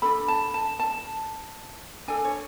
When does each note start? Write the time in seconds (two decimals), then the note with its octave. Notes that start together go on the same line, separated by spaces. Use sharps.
0.02 D4 A4 B5
0.28 A5
0.54 A5
0.79 A5
2.08 D4 A4 G#5
2.24 C#5